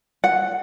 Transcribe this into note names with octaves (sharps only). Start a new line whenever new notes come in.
F#5